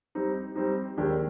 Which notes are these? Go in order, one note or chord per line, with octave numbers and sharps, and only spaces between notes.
G3 C4 D#4
G3 C4 D#4
D#2 D#3 G#3 D4 G4